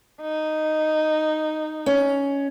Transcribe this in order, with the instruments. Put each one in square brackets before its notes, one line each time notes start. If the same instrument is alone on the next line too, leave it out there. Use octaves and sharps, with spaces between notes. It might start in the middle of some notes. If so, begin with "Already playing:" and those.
[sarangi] D#4
[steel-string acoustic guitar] C#4